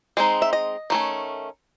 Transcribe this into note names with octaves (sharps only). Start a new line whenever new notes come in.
G#3 C4 D#4
E5
D#5
D#3 A3 C#4